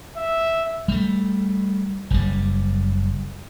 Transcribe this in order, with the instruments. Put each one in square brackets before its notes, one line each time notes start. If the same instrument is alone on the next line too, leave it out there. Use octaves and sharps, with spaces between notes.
[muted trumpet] E5
[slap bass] G3 A3
F#1 G3